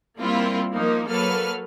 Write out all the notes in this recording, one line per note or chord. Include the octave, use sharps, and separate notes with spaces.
G3 A#3 C4 E4 F4
F3 A#3 D#4
F#3 A#3 A4 B4 F6